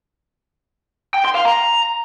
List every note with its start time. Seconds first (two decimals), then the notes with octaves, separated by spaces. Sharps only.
1.14 G5
1.25 C6
1.35 F5
1.45 A#5